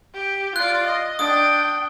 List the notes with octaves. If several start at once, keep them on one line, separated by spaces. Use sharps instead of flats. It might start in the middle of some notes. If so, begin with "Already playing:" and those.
G4
F4 D5 F#6
D#5
D4 G5 D#6